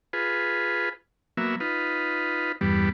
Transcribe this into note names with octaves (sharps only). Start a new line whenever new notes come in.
F4 G#4 B4
F#3 A#3 B3 E5
D#4 F4 B4
E2 G2 G3 B3